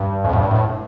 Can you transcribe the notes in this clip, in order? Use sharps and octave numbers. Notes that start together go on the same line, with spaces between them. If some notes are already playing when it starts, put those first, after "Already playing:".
Already playing: G2
F2
A2
G2
A2